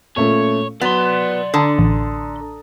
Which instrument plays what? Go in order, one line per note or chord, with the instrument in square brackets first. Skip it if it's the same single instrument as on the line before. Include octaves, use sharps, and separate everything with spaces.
[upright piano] A#2 A3 C#4 [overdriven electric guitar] C#5
[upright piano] F#3 [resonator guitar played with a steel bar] B3 [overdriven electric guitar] D5 C6
[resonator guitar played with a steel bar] D3 [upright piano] A5 A#5 D#6
[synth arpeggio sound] A1